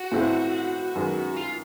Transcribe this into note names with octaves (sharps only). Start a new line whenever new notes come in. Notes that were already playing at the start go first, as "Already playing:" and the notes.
Already playing: F#4
A2 E3 A3 C4 F4
F#2 D#3 G#3 B3
F4